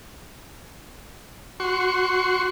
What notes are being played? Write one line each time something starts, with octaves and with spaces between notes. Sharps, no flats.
F#4 C6 C#6